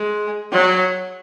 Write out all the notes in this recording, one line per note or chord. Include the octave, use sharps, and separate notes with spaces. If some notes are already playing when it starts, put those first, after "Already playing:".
Already playing: G#3
F#3